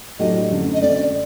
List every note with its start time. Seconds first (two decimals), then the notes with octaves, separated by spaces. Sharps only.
0.19 A2 F#3 A3 D4 G4 D#5
0.51 F#2 D3 A3 C4
0.74 D#5
0.82 F#2 D3 A3 C4 D5